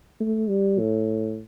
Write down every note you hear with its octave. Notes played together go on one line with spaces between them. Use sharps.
A3
G3
A2